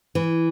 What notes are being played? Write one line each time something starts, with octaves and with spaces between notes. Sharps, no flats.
E3